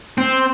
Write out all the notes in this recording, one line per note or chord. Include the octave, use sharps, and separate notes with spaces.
C4